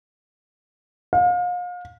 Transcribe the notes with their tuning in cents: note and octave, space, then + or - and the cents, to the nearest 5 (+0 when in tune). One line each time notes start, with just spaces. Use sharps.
F5 +35